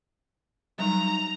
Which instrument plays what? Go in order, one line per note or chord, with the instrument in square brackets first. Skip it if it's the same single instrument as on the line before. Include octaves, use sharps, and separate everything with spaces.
[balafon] F#3 G3 D#4 [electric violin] A#5